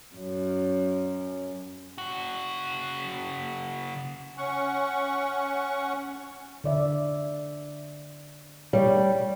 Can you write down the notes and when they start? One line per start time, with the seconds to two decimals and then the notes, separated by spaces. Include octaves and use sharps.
0.16 F#2
1.98 C#3 F#4
4.37 C#4 F#5 C#6
6.64 D3 D5 E5
8.73 G3 C#5